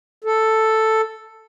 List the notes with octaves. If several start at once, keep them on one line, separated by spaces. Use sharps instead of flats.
A4